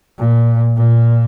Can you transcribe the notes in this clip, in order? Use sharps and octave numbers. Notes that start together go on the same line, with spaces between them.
A#2
A#2